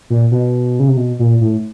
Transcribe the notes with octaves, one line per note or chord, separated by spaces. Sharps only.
A#2
B2
C#3
C3
B2
A#2
A2